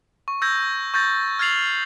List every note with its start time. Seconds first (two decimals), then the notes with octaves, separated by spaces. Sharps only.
0.28 C#6
0.42 E6 G6 G#6 A#6
0.94 C#6 G6 A6 A#6
1.39 F6 G#6 A6 C7 F7 F#7